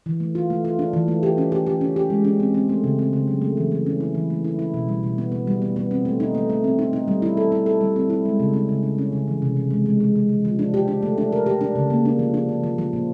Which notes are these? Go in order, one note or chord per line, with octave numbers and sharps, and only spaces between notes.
E3
A3
F4
A3
F4
D4
E3
A3
G4
C#4
G4
G4
C#4
G4
G#3
C#4
C4
C4
A3
C#3
C4
C#3
F#3
A3
E3
A3
C#4
E4
E3
A3
E4
E4
B2
G3
B2
B3
B3
G3
B3
B3
C4
A3
D#4
A3
A3
C4
D#4
D#4
G3
E4
A4
E4
A4
G3
C4
E4
G#3
C#3
C#4
C#3
C#3
C#4
C#3
E3
C3
C3
G#3
G#3
G#3
G#3
F3
F3
D4
G4
D4
A3
D4
A#4
G4
D4
C#3
A#3
D4
F3
D4
F3
F3
F3
A#2